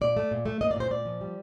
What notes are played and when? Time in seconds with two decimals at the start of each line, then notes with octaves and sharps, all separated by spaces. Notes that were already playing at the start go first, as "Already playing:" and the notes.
0.01 A#2 D5
0.17 A3
0.31 A#2
0.46 A3
0.61 A#3 D#5
0.71 D5
0.76 A#2 C5
0.91 A#2 D5
1.06 F3
1.21 G3